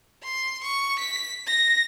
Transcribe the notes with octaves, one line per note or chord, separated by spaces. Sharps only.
C6
C#6
B6
A#6